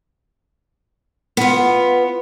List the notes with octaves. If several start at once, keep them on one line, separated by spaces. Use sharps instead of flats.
B3 F4